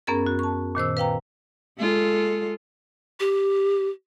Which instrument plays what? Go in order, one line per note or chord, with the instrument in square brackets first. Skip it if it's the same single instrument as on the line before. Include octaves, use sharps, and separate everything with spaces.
[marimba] F#2 B3 C#4 G#4 A#4 A6
F#4
A5 C#6
A#2 D#3 C5 E6
B4 F5 G5 A#5
[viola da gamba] G#3 F4 A4
[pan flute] G4